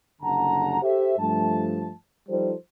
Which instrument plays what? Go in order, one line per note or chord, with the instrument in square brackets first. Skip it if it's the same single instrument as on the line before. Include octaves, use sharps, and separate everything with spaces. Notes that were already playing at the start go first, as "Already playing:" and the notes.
[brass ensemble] F#1 D3 G3 F#5 A5 A#5
G4 A4 C5 E5
G2 F3 A3 A5
F3 G3 D#4 F4 A4 C5